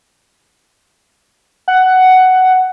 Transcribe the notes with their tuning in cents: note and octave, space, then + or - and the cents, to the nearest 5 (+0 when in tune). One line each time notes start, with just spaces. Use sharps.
F#5 +10